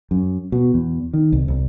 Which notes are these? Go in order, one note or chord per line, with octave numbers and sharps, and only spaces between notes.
F#2
B2
E2
D#3
C2
C2